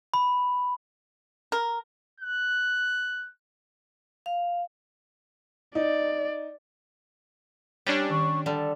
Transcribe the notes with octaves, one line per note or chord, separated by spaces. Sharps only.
B5
A#4
F#6
F5
D#4 D5
G3 C#4 D4 G5
D#3 C#6
D3 G3 A4